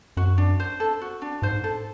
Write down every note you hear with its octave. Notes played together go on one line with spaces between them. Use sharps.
F#2 F#4
D4
C5
A4
F#4
D4
G#2 C5
A4